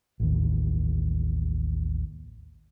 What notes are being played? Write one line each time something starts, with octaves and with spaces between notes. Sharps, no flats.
A1 D#2